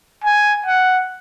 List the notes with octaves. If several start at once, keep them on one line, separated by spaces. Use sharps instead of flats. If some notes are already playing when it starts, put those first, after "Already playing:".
G#5
F#5